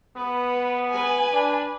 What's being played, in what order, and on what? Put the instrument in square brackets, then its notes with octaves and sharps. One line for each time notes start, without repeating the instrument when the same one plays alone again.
[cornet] B3 [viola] B4
[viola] B4 G#5
[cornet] D4